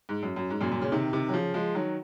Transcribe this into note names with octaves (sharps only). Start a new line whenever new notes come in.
G#2
F#2
F#2
G#2
F#2 A#2
F#2 A#2
A#2 C#3
C3 D#3
C3 D#3
F#3
C#3 F3
F3 G#3
D#3 F#3